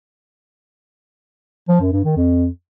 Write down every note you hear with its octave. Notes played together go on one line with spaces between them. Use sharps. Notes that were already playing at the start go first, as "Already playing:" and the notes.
F3
F#2
G2
D#3
F2